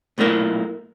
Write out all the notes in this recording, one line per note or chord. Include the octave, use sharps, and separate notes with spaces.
B1 A#2 A3 A#3 E4